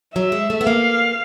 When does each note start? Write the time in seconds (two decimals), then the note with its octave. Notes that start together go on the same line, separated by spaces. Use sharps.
0.16 F#3 E5
0.32 G#3
0.50 A3
0.61 B3
0.66 A#3 F5